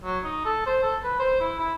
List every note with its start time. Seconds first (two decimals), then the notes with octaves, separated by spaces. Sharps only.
0.04 F#3
0.24 D#4
0.45 A4
0.67 C5
0.83 A4
1.04 B4
1.19 C5
1.40 E4
1.59 E4